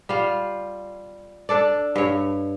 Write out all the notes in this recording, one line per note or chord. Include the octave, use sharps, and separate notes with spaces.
G3 F4
D4 A4 D5
G2 C#5